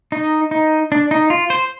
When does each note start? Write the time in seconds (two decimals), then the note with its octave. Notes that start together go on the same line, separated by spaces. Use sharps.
0.12 D#4
0.51 D#4
0.92 D4
1.11 D#4
1.30 F4
1.50 C5